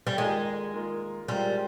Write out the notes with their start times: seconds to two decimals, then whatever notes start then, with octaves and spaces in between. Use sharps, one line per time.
0.07 G3
0.18 D#3 G#3 A#3 F4 A#4
0.73 D#3 A#3 F4 A#4
1.28 G3 G#3 C4 F4 A#4